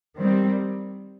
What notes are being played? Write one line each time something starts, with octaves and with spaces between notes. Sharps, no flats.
D#3 G3 C4